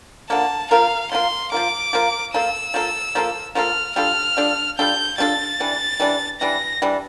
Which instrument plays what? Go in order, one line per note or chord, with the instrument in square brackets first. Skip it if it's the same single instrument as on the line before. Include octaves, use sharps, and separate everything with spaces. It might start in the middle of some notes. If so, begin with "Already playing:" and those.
[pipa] D3 F3 A#3 [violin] A5
[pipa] F3 A#3 F4 A#4 [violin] F5
[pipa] F3 A#3 F4 A#4 [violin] C6
[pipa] F3 A#3 F4 A#4 [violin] D6
[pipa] F3 A#3 F4 A#4
[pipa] F3 A#3 F4 A4 [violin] E6
[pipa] F3 A#3 F4 A4
F3 A#3 F4 A4
[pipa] F3 A#3 F4 A4 [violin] F6
[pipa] G3 D4 F4 A4 [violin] F6
[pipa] G3 D4 F4 A4
[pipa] G3 D4 F4 A4 [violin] G6
[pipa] G3 D4 F4 A4 [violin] A6
[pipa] E3 G3 D4
E3 G3 D4
[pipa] E3 G3 D4 [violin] A#6
[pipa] E3 G3 D4